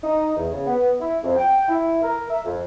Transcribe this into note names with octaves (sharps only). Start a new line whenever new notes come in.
D#4
E2
C#3
B3
E4
F2
G5
E4
A#4
E5
F2